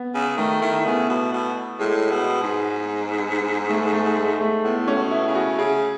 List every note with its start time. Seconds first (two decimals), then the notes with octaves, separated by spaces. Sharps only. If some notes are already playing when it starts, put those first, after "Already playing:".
Already playing: B3
0.15 C#3
0.37 D#3 A3
0.62 D#3 E4
0.85 C#3 B3
1.09 B2
1.33 B2
1.79 A2 G#3
2.11 B2
2.43 G#2
3.70 A3
3.93 A3
4.17 G#3
4.41 A3
4.64 A2 B3
4.88 C#4
4.96 B2
5.11 E4
5.27 C#3
5.35 F#4
5.58 C#3 G#4